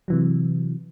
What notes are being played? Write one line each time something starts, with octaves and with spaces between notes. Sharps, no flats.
C3 E3 F#3